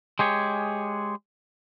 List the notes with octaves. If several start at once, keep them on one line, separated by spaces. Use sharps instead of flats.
G#3 G4 G#4 C#5